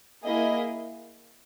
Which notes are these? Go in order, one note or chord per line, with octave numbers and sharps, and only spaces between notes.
A#3 E4 G#4 D#5